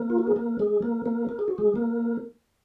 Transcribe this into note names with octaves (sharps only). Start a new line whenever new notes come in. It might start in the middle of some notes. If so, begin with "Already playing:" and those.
Already playing: A#3 A#4
F4
F#4
G#4
A#3 A#4
G#3 G#4
A#3 A#4
A#3 A#4
A#4
G#4
F#4
G#3 G#4
A#3 A#4